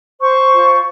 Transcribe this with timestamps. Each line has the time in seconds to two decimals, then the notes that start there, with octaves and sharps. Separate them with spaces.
0.19 C5 C#6
0.52 F4